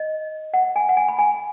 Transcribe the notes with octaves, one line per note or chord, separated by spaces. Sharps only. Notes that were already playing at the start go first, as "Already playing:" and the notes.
Already playing: D#5
F#5
G#5
F#5
G#5
B5
G#5